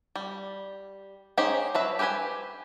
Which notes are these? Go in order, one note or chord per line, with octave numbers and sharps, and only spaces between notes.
G3
C#4 D#4 G4 G#4 C5
F#3 B4 E5
G4 G#4 B4 C5 G#5